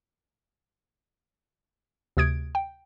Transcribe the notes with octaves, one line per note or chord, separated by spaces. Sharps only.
D2 C3 D#6 G#6 D7
G5